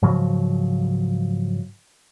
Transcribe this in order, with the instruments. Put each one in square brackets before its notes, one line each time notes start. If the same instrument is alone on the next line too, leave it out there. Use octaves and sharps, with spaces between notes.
[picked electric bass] G#2 C#3 F3 F#3